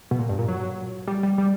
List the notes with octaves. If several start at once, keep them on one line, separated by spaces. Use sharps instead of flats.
B2
A#2
G2
A#2
F#3
G3
G3
G3